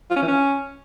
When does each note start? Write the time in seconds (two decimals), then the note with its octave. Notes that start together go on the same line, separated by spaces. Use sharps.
0.11 F4
0.16 C#4
0.22 E3
0.28 C#4